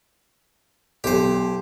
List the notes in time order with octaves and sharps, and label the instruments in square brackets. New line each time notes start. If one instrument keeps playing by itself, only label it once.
[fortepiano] B1 [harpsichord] G4 C5